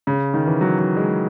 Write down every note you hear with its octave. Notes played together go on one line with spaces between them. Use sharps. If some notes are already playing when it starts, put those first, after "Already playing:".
C#3
D#3
E3
F#3
F#3
G#3